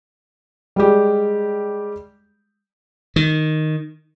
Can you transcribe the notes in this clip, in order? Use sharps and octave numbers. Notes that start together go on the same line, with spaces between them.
G3 G#3 G4
D#3